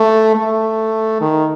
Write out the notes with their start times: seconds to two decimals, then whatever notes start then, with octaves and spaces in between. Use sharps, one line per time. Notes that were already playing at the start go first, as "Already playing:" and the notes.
Already playing: A3
0.35 A3
1.21 D#3